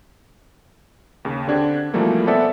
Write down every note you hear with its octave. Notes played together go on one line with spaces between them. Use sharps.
D#2 C#3
D3 C4 D4 G4 G#6
B2 E3 F3 G3 A3 A#3
B3 C4 A4 D5 E5 F#5